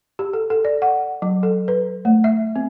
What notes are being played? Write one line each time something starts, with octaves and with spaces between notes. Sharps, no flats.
G4
A4
A4
D5
F#5
F#3
A4
B4
A3
E5
C4